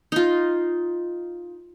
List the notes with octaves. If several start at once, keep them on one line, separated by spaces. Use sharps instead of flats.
D#4 F4